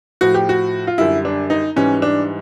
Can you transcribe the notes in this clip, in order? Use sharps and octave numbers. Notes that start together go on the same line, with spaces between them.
A2 F3 F#4
G4
F#4
F4
F#2 D3 G3 E4
D4
D#4
G#2 E3 G3 C#4
D4